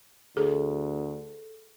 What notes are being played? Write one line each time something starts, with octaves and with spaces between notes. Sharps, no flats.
D2 G#4 A4